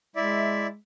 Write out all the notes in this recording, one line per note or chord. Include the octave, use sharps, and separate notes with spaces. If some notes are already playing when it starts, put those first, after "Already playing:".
G#3 E4 D5 E5